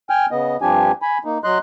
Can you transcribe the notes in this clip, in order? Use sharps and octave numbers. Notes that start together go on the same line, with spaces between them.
G5 G#5 F6
C#3 B3 D#5
G2 F3 C4 D4 G4 G#5
G#5 B5
A#3 D#4
F#3 D#5 C6 F#6